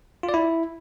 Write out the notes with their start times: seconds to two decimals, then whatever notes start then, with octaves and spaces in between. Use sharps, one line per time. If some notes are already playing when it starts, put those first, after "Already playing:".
0.23 F4
0.29 D5
0.34 E4